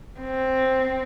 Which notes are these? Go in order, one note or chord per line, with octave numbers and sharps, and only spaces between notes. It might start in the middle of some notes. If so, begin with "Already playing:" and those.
C4